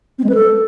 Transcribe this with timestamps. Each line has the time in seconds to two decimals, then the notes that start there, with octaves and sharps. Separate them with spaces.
0.19 C4
0.24 G#3
0.29 B4
0.35 A4